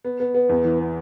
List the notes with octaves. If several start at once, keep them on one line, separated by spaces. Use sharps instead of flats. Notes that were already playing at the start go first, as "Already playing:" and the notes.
B3
B3
B3
E2
E3
B3